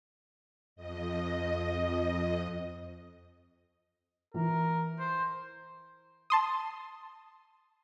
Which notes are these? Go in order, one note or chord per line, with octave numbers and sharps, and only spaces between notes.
F2 D#5
E3 A#4
C5
A5 C6 D#6